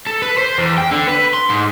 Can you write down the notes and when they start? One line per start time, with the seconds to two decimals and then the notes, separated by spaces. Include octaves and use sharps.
0.07 A4
0.22 B4
0.38 C5
0.58 E2
0.78 G5
0.91 D3
1.07 B4
1.34 C6
1.50 G#2